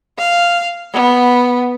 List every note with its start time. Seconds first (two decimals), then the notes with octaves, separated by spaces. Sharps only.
0.18 F5
0.93 B3